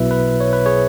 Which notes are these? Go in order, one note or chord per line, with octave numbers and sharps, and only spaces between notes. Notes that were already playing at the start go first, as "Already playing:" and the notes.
Already playing: B1 B2 F#3 B3 E4 B4 E5
B4
C#5
B4
G#4 C#5